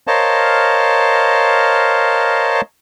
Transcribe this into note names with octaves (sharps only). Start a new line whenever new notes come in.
A#4 C5 C#5 D#5 F5 A5